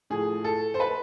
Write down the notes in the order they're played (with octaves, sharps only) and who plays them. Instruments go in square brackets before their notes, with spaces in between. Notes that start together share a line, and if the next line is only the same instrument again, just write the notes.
[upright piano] A2 F3 G#4
A4
C5
B4